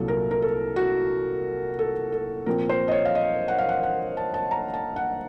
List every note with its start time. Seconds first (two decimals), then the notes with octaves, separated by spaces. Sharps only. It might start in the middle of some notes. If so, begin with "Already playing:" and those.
Already playing: C2 A#2 F#3 A#3 A4
0.08 A#4
0.31 A#4
0.42 A4
0.76 F#4
1.79 A4
2.12 A4
2.46 A#2 F3 C4 A#4
2.69 C5
2.88 D#5
2.91 C#5
3.05 F5
3.15 D#5
3.48 F#5
3.58 F5
3.69 F#5
3.83 F#5
4.17 A5
4.34 A5
4.51 A#5
4.74 A5
4.96 F#5